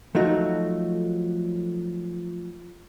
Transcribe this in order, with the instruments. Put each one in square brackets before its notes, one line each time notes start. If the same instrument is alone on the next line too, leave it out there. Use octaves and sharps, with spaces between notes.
[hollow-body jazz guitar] F3 F#3 A3 D#4 F#4